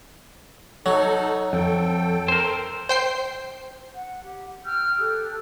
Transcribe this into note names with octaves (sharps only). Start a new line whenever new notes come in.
F#3 D#4 A4
F2 A4 G5
A#4 C5
C5 G5 C7
F#5
G4
G5 E6 F6 G6
G4 A4 F#6